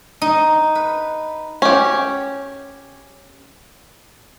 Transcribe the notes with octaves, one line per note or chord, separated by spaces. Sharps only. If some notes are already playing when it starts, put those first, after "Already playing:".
D#4
B4
C#4 G4